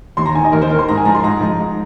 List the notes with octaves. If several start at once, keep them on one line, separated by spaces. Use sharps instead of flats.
D#2 C6
A#5
D#3 G#5
D#5
D#2 A#4
C5
D#3 A#4
C6
G#2 A#5
G#5
F3 A#5
C6
G#2 A#5
F3
G#2